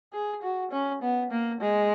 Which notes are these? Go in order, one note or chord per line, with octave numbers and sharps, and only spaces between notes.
G#4
F#4
C#4
B3
A#3
G#3